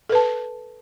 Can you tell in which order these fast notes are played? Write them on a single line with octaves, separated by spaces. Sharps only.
A4 B4 A5